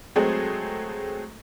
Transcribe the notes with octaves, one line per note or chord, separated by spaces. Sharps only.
F#3 G#3 A3 C4 G#4